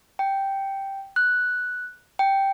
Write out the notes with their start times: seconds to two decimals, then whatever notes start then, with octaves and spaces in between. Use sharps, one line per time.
0.19 G5
1.16 F#6
2.19 G5